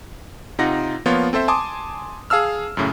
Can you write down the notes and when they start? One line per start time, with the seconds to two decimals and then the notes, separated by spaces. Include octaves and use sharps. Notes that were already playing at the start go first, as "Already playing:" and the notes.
0.59 C3 D#4 F4 F#5 A#6
1.06 F3 A#3 B3 F4 C#5
1.33 C4 A4 C5 E5
1.48 G#5 A5 C6 D6 D#6
2.30 G#4 F5 A5 E6 F6
2.77 F#2 A2 C#3